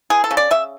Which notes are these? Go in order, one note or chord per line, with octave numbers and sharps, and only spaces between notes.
E3 G#4
A4
C#3
D5
C#3 E5